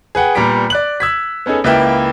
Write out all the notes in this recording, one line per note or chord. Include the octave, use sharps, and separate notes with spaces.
G#4 B4 F#5 G5
A#2 G3 B3 A#5 B6 D7
D5 F#6 F#7
E6 G#6 B6
B3 C#4 D#4 G#4 A4
C#2 A#3 E4 B4 E5 G5